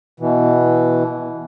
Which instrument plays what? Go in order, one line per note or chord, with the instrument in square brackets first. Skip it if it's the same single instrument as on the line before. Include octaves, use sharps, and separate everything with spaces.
[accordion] B2 E3